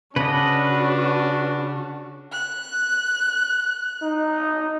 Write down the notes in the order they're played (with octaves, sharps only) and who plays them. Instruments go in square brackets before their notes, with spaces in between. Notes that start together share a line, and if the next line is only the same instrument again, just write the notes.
[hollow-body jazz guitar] C#3 [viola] C#4 F#4 [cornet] D4 [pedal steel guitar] B4 D#5
[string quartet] F#6
[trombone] D#4